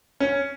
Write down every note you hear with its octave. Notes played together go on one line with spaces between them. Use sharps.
C#4